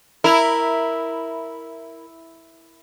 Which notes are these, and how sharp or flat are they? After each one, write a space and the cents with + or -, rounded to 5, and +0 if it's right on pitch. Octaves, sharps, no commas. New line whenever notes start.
E4 -5 A#4 +0